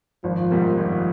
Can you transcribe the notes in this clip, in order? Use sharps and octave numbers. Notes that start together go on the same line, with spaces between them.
G#1 F3
G#2 G3 A#3
G#1 F3